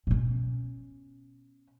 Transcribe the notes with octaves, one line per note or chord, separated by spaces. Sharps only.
B2 C#4